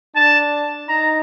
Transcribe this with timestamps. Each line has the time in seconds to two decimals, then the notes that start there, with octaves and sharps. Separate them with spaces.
0.16 D4 A5
0.89 D#4 A#5